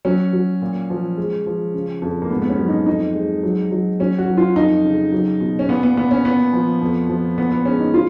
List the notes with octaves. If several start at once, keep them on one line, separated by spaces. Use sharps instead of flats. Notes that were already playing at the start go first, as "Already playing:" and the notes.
F#3 C#4
F#3
A#2
F3
G#3
F3
C#3
F2
A#3
G#2 B3
B3
C#4
F#3
D#4
F2 D#4
G#3
F#3
F#3
F#3 C#4
F#4
F#3
F4
F2 D#4
C#3
F#3
B2
C#4
A#2 B3
B3
A#2 B3
C#4
A#2 B3
F3
F2
F3
A#2 B3
B3
G#3 C#4
D#4
A#2 F4